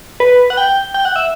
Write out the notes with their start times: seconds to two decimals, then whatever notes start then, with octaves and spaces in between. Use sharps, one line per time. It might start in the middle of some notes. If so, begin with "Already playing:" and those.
0.20 B4
0.50 F#5
0.57 G5
0.94 G5
1.05 F#5
1.16 E5